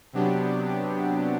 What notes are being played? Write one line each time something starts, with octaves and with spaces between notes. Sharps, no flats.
C3 F#3 B3 D4 G4